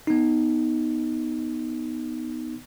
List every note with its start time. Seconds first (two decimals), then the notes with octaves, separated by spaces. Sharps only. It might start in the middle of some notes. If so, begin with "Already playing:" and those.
0.07 B3 D#4